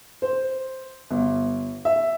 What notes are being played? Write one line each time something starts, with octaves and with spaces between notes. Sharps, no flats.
C5
G1
E5